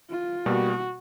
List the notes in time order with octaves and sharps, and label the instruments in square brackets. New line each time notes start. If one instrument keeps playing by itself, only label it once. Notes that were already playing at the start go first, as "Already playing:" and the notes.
[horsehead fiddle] F4
[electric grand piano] B2 G3 A#3 [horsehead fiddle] F#4